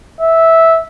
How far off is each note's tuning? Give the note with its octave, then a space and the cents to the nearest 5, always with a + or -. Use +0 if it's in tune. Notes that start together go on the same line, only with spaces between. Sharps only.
E5 -10